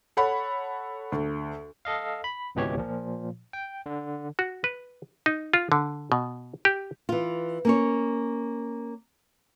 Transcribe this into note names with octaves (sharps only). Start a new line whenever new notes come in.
A4 C#5 F#5 B5
D2
A4 D#5 F5
B5
G#1 C#2 B2 E3 G4 C#5
A#2 F3
G5
D3
F#4
B4
D#4
F4
D3
B2
G4
E3 F4
A#3 C#4 C#5